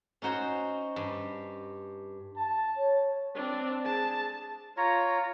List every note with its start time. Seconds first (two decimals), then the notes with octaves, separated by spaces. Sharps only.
0.22 C#4 D#4 F#4 C5
0.96 G2
2.37 A5
2.77 C#5
3.35 C4 D4
3.84 G#4 A5
4.77 F4 C#5 A#5